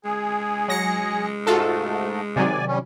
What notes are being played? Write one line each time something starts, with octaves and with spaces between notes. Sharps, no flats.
G#3 G#4
F#3 A#6 C#7
G#2 A3 F4 F#4 A4
C3 D#3 F#3 D5 G#5
G3 C#4